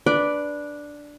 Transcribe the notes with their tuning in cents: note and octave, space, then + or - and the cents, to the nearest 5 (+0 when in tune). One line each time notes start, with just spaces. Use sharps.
D4 +0 B4 +0 D5 +0